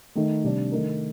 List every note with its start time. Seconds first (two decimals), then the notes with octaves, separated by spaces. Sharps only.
0.15 D#3 A3 D#4
0.44 C3 G3 D4
0.72 D#3 A3 D#4 A#4